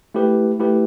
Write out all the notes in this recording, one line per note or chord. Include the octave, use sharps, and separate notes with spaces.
A3 E4 G4 B4
A3 E4 G4 B4